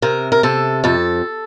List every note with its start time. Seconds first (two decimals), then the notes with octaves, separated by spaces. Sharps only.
0.02 C3 A#4
0.32 A#4
0.43 C3 A4
0.84 F2 A4